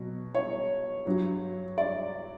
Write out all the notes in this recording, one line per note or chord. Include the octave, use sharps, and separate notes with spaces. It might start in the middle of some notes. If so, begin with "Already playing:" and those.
Already playing: B2 F#3
C#5
G2 F#3
D5